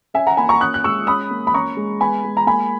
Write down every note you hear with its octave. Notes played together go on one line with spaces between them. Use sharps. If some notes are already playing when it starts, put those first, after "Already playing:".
C#4 E5 G#5
F#5 A#5
A#3 G#5 B5
A#5 C#6
C#4 D#6 F#6
F#6
G#3 C#6 E6
C#4 B5 D#6
A#3
B5
C#4 A#5 C#6
G#3
B3 G#5 B5
G#3
A#5
A#3 G#5 B5